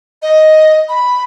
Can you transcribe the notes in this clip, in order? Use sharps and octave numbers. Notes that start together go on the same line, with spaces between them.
D#5
B5